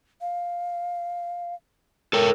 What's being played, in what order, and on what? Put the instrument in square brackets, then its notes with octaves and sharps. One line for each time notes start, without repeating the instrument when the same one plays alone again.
[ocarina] F5
[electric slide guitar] A4 C#5 G5 [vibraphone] A#4